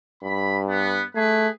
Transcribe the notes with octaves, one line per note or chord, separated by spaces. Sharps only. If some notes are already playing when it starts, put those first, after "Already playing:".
G2 B5
B3
A3 G#4 B4